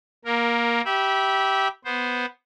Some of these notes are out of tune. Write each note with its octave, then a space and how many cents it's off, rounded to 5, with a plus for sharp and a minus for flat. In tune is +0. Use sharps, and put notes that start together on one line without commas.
A#3 +15 A#4 +0
G4 -15 E5 -15 B5 -25
B3 +0 C5 +0